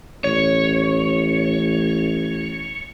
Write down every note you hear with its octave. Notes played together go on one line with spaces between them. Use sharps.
A1 C#5